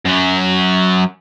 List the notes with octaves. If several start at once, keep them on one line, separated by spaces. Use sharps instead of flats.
F#2 F#3